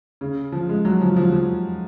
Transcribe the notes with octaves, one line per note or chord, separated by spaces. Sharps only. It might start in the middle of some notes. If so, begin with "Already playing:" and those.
C#3
F3
G#3
F#3
F3
F3
F3